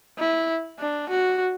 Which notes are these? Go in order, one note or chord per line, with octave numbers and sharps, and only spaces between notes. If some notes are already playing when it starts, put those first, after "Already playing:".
E4
D4
F#4